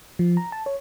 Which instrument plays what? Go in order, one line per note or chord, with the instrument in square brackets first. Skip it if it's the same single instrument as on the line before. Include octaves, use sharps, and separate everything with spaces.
[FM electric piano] F3
A#5
A5
C#5